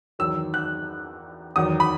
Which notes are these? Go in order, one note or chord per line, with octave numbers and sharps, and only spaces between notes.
E2 D#3 F#3 E6
F#6
E2 D#3 F#3 D#6
B5